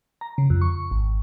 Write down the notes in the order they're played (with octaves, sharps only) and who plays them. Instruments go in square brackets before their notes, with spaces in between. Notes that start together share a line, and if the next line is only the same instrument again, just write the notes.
[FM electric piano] A#5
C#3
F2
C#6
G#1